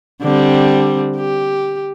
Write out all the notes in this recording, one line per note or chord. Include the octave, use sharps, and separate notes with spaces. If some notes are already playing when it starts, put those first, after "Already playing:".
D3 G3 C4
G4